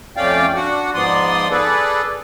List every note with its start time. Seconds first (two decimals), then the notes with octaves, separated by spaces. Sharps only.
0.17 F2 A3 C#4 D5 F5 G5
0.55 D4 F#4 F#5
0.94 G#2 F3 B3 D5 C6 D#6
1.51 G#4 A4 B4 D5